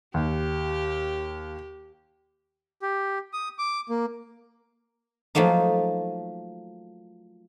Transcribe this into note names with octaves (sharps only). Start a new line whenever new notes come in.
D#2 G4
G4
D#6
D6
A#3
F3 F#3 A3 A#3 D#4